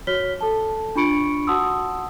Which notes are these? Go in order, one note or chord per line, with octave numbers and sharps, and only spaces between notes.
F#4 C#5 F6 B6 G7
A4 A5
D4 F4 B5 C#6 C#7 D7
F#4 F#5 A5 C6 D#6 E6